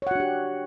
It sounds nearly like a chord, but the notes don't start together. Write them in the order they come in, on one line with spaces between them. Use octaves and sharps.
C#5 F#5 F#4 D4 G4